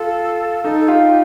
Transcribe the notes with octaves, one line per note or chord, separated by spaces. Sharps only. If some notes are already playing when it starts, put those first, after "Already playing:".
Already playing: F4 A4
D#4 A4
A4
F4 G4